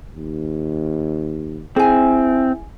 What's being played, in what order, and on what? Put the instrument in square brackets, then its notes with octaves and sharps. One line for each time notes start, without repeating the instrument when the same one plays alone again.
[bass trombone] D#2
[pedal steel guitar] C4 [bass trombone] E4 [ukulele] G#4 G#5